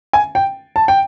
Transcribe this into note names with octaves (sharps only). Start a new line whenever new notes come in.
G#5
G5
A5
G5